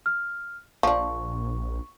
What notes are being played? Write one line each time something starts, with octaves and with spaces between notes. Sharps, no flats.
F6
A#1 F3 D4 C#6